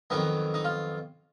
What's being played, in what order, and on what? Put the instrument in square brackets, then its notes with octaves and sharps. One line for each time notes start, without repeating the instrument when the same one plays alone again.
[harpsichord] F2 D#3 F#3 B3 D#4
D#4
F4